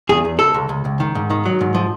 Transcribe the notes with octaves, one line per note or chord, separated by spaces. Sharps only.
E2 G#4
E2
C#2 A4
C#2
C#2
C#2
D#3
G#2
D#3
F#3
G#2
F3